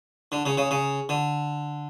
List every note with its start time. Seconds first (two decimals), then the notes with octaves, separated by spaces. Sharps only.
0.32 D3
0.46 C#3
0.57 C#3
0.71 C#3
1.09 D3